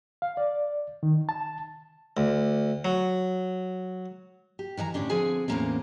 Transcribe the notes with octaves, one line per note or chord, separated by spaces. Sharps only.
F5
D5
D#3
A5
D2
F#3
G4
D#3 E3 D5 A#5
A2 D3 C#4 D4 G4
D3 F3 C4 G#4 G#5
E2 A2 C3 A#3 C4 C#4